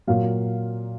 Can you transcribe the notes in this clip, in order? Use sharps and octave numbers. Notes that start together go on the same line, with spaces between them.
A#2 F#3 F5